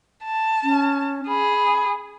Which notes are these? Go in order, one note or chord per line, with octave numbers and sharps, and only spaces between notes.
A5
C#4
G#4 B5